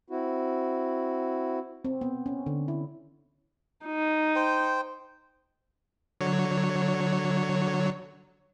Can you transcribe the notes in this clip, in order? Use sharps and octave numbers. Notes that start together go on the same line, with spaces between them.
C4 E4 F#4
C4
B3
C#4
D3
E4
D#4
C5 G5
D3 F#3 C#5